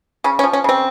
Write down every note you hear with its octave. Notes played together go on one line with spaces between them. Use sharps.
C#3 C#4
C#4
F3
C#4
C#3 C4